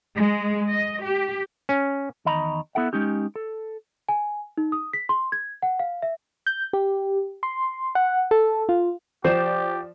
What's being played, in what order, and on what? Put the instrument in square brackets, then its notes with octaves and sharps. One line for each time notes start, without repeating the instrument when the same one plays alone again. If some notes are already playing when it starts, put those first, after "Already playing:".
[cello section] G#3
D#5
G4
[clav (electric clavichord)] C#4
[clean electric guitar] E2 D#3 D#5 A#5 B5
B3 E4 A4 E5 F#5
G#3 C#4 D#4 G4
A4
[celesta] G#5
D#4
D#6
B6
C6
G#6
F#5
F5
E5
[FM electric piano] G6
G4
C6
F#5
A4
F4
[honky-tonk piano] F3 D5 E7 [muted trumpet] G4 [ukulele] C5